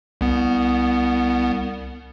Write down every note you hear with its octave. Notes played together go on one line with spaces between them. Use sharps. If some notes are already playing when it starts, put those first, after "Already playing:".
C2 B3